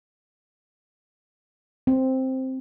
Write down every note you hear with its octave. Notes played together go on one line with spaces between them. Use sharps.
C4